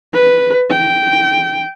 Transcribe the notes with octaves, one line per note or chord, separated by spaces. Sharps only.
B4
G5